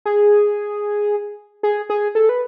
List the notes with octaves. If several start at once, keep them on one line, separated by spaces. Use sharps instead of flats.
G#4
G#4
G#4
A4
B4